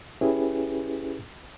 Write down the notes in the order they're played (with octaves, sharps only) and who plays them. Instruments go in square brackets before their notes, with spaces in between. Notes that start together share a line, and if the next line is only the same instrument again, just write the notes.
[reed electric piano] C#4 E4 G4 G#4 B4